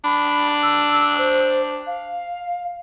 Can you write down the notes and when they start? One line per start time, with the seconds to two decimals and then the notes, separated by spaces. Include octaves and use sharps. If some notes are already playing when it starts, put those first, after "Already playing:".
0.04 D4 B5
0.63 E6
1.18 C5
1.87 F5